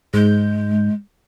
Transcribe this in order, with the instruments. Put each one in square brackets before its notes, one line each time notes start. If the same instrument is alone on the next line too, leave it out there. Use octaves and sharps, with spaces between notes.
[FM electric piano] G#2 G6 [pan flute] G#3